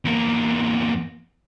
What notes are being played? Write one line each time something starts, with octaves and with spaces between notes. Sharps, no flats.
E2 A#3